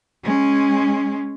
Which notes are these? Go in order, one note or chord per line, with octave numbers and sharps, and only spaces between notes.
G#3 C#4